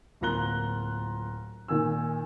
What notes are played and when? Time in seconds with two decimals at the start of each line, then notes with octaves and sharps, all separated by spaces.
0.21 D1 A#3 F4 A#5 F#6 G7
1.68 A#2 D#3 G#5 E6